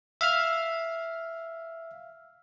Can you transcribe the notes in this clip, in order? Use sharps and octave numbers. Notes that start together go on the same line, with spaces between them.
E5 F5 F6